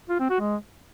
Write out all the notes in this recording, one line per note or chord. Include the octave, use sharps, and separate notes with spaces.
F4
C4
F#4
G#3